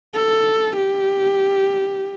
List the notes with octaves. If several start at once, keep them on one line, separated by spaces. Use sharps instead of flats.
A4
G4